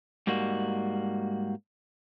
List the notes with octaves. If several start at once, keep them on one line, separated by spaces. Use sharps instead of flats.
G#2 G3 A#3 F#4